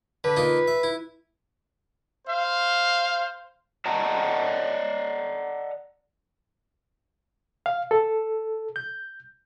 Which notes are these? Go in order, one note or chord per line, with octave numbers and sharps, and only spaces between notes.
D3 B4
A#3 D#4 F4
E5
E4
C5 F5
D5 D#5 F#5 A5 A#5
F5
A4
G6